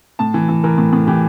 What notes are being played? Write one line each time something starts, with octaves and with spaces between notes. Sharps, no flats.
A2 A5
E3
E3
E3 A#4
A2
A2
E3 G4